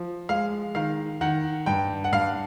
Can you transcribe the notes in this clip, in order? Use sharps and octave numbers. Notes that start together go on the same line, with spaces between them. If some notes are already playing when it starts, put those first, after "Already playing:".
Already playing: F3
G#3 F5
D#3 F5
D#3 F#5
G2 G5
F#5
G2 F5